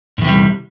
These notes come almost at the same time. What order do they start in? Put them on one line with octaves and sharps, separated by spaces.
G#2 E2 C3 G3